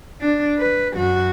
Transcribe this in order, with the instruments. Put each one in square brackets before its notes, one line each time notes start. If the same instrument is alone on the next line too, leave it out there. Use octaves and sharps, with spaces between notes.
[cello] D4
B4
F#2 F#4